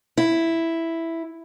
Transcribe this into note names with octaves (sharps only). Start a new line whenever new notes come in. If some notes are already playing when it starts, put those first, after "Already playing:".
E4